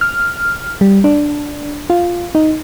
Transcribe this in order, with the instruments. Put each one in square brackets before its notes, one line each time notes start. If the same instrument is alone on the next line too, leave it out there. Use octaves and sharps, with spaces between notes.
[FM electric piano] F6
G3
D4
F4
D#4